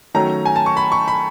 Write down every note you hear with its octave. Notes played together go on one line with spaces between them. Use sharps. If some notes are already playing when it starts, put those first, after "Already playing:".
D#3 F#3 A3 C#4 A#5
G#5
A5
C#6
B5
C#6
B5